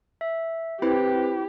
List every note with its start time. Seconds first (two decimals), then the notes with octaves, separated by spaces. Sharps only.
0.21 E5
0.82 C4 E4 G4 B4 C5